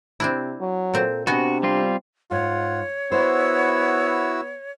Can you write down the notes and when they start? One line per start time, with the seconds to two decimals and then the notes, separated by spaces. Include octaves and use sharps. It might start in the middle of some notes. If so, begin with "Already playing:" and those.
0.20 C3 C4 D4 E4
0.60 F#3
0.94 A#2 C4 A4
1.27 C3 B3 D4 F#4 D#5 G#5
1.63 G3 C4 F4
2.31 G#2 F4 C#5 F#5
3.12 B3 E4 F#4 C5 E6